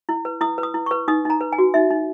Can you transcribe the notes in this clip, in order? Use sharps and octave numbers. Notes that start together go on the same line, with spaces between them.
E4
B4
E4 D#6
B4
D#6
E4
C#6
B4
D#4 D#6
D#4 A#5
B4
G#5
F#4
D#4 E5
D#4